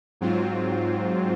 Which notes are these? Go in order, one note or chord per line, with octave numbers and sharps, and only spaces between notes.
G#2 F#3 C4 F4